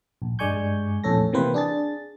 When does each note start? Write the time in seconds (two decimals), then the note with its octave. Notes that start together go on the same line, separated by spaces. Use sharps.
0.22 A#1
0.39 G2 G#3 D5 G#5 C#6 G6
1.04 A#1 F2 A2 C#4 A4 A#6
1.33 C3 E3 A#3 C4 B4 C5
1.54 D4 G#4 A6